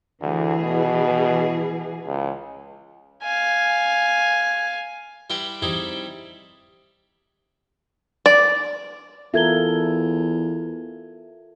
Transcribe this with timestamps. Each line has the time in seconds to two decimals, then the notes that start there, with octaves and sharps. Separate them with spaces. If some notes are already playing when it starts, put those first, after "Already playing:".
0.22 D2 E3 G#4
0.62 B2
2.06 C#2
3.23 F5 G#5
5.30 G3 E4 G4 B4 A#5 C6
5.62 G3 C4 D#4 E4 G4 G#4
8.26 D5
9.34 E2 F4 A4 A#4 E5 G#6 G7